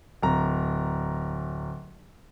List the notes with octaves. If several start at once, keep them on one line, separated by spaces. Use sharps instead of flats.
D1 A#5